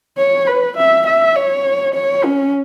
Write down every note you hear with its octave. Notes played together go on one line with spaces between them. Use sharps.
C#5
B4
E5
E5
C#5
C#5
C#4